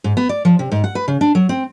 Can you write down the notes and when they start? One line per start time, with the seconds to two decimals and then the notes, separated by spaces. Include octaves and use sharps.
0.04 G#2
0.17 B3
0.29 D5
0.45 F3
0.59 C3
0.72 G#2
0.84 F#5
0.95 B4
1.08 C#3
1.21 D4
1.35 F#3
1.49 C4